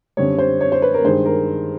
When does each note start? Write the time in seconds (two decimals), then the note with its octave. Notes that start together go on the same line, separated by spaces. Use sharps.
0.17 F#2 D3 G3 C4 C#5
0.39 C5
0.61 C#5
0.72 C5
0.82 B4
0.94 A#4
1.04 G2 D#3 G#3 C5
1.26 A#4